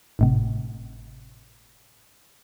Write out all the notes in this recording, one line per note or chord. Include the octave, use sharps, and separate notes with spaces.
G#1 A2 C3